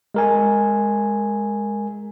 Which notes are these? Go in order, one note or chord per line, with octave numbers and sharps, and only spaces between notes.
G#3 A#4 G#5